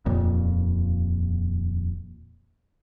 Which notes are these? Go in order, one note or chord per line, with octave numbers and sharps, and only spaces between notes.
D#1 F2 A#2